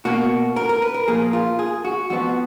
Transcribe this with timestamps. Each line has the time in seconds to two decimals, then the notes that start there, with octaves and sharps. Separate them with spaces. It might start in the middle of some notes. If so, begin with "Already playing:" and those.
0.05 B2 A#3 F#4
0.56 A#4
0.69 A#4
0.82 B4
0.94 A#4
1.08 A#2 F3 A#3 G#4
1.33 F4
1.59 G#4
1.85 F#4
2.10 F2 F3 B3 F#4